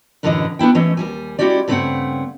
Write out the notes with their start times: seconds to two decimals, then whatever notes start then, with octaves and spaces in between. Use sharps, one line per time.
0.23 F#2 A2 D3 E3 C#4 D#5
0.59 B3 D4 E4 G5
0.75 E3 A3 C#4 D#5
0.97 D#2 G3 G#5
1.39 G#3 C#4 E4 F#4 G4 D5
1.68 G2 C#3 G#3 A3 C4 F#5